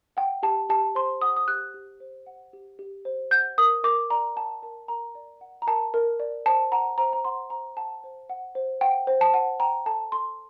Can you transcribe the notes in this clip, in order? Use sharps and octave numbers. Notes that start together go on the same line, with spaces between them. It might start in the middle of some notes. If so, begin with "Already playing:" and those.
F#5 G5
G4 A5
G4 A5
C5 C6
F#5 D#6
D#6
G4 F#6
G4
C5
F#5
G4
G4
C5
F#5 G6
A#4 D#6
A#4 D6
D5 A#5
F#5 A5
A#4 A5
A#4 A#5
D5
F#5
A#5
A#4 A5
A#4
D5
C5 A5
F#5 A#5
C5 A#5
A#5
F#5 C6
C5 A#5
F#5 A5
C5
F#5
C5
F#5 G5
C5
A5
F#5
G5 A#5
A4 A5
A4 C6